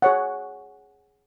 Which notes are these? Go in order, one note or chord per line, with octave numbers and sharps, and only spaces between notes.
G#4 C#5 F#5